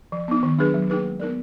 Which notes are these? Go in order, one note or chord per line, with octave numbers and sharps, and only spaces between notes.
F3
B3 D#4
D#3
F#3 D4 G#4 B4
F#3
A#3 D#4 G#4 B4
G#3
B3 D#4 A#4 D5